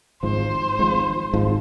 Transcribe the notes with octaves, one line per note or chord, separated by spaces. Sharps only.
G#1 G#2 F3 C5
G#1 G#2 F3
G#1 G#2 F3